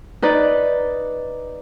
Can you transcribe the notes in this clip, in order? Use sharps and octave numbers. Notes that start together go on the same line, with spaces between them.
D#4 B4 D5